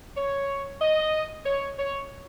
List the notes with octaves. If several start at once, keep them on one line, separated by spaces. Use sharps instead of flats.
C#5
D#5
C#5
C#5